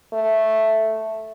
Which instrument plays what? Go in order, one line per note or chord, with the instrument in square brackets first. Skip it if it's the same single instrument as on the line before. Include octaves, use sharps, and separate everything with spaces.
[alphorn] A3